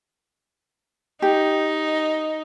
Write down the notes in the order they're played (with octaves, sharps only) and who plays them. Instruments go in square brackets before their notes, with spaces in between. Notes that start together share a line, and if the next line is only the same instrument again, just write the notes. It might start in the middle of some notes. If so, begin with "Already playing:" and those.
[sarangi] D#4 [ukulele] G4